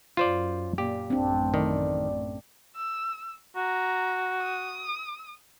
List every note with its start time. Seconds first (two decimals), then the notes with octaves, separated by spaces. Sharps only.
0.17 F#2 F4 C5 D5
0.78 A#2 G4
1.10 A1 F#2 A3 C4 D4
1.54 D#3 D5
2.76 E6
3.56 F#4 A#5
4.42 D#6